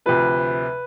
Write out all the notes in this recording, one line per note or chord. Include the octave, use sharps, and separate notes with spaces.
D2 C3 F3 B4